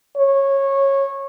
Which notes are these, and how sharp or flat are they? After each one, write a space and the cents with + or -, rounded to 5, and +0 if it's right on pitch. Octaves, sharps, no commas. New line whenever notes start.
C#5 -15